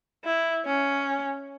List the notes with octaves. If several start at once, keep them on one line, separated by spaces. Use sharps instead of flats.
E4
C#4